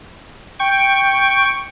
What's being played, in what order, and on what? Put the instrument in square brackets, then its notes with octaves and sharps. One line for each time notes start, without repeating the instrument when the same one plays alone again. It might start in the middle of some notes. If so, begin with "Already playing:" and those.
[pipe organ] G5 C#6